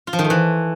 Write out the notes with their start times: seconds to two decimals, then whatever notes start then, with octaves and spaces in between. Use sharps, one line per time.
0.07 F4
0.13 F3
0.19 D#3
0.24 A3
0.30 E3